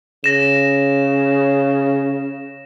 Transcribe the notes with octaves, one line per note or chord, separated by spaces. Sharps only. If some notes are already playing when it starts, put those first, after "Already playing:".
C#3 A#6 E7